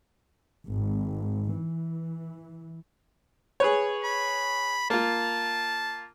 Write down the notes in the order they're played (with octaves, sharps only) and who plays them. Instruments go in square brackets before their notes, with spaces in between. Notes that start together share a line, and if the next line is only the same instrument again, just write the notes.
[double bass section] G#1
E3
[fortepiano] G#4 B4 C#5
[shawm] B5
[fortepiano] A#3 F4 [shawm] A5